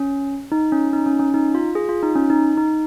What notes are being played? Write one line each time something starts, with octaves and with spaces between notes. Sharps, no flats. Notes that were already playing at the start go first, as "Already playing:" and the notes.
Already playing: C#4
D#4
C#4
D#4
C#4
C#4
D#4
F4
G#4
F4
D#4
C#4
D#4
D#4